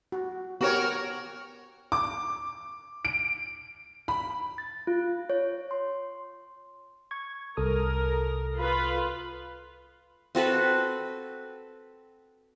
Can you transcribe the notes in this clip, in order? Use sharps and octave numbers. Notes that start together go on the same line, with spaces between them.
F#4
B3 F#4 G4 A#4 C#5
D6
D7
B5
A6
F4
C#5
C6
C#6 G#6
C2 A4 A#4 D#6
F4 B4
C4 F#4 A4 B4